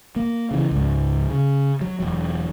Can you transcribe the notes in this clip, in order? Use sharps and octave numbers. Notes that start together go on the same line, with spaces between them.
A#3
C#3 E3
C#2 G#2
C#3
F#3
E1 F#3